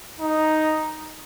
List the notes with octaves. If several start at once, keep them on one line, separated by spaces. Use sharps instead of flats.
D#4